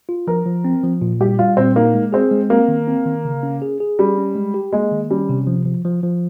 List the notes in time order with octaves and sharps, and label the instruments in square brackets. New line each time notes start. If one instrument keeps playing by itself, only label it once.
[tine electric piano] F4
[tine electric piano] F3 [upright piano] A#4
[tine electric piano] F3
C4
F3
A#2
[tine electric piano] G3 [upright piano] G4
[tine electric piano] G3 [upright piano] F4
[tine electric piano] A#2 [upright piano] C4
[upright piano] A#3 [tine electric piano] D#4
[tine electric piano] G#3
[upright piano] C4 [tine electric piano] G#4
[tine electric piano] G#3
[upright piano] A#3 [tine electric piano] C4
[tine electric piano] D#3
C4
D#3
C#3
C#4
G#4
G#4
[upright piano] G3 [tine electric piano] C#4
[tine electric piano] C#4
G#3
G4
[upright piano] G#3 [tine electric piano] A#3
[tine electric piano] D#3
[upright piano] G3 [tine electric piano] C#4
[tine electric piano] C3
F3
F3
F3
F3